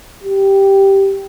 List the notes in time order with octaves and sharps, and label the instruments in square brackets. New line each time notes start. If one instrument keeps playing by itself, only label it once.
[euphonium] G4